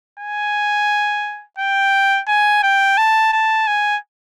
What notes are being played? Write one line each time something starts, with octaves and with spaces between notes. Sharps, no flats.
G#5
G5
G#5
G5
A5
A5
G#5